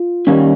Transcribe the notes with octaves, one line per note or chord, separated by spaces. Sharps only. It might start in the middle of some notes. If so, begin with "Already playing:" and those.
Already playing: F4
D#3 G3 A#3 C#4